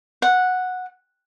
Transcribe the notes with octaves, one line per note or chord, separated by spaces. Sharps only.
F#5